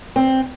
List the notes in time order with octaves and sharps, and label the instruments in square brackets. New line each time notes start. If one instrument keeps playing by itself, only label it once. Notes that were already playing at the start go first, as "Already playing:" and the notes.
[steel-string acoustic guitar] C4